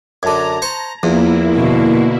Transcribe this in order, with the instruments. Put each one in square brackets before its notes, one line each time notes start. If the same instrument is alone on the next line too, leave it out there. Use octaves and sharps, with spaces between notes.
[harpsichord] F#2 D3 [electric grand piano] A5 G#6 [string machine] A#5
[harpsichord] C5 C#6
[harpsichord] E2 [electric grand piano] F3 [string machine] A#3 E4
[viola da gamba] B2 D3